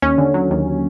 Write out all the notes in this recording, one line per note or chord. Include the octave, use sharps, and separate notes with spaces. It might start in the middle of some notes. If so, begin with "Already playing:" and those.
D#2 C#4
D3
F#3
D#2